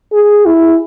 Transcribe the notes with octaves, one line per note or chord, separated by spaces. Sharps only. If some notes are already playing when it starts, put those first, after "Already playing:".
G#4
E4